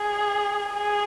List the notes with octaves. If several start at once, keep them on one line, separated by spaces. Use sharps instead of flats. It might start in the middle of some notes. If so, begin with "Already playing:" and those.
Already playing: G#4
G#4